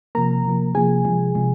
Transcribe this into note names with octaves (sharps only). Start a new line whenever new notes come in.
C3 F3 A#3 A#4 A#5
C3 F3 A#3
C3 F3 A#3 G#4 G#5
C3 F3 G#3
C3 F3 G#3